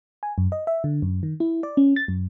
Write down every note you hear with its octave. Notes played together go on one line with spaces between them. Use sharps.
G#5
F#2
D#5
E5
D3
F#2
D#3
E4
D5
C#4
A6
F#2